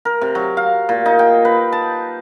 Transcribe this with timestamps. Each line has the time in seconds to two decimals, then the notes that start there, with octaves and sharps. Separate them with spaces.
0.05 A#4
0.21 C3
0.35 F#3
0.57 F5
0.89 A#2
1.06 D#4
1.19 G5
1.45 B4
1.72 A5